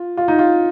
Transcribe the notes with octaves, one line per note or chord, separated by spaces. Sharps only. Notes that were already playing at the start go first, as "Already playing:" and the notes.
Already playing: F4
F4
D#4
F4